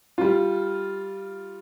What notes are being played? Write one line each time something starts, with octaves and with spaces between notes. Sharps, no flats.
G3 F4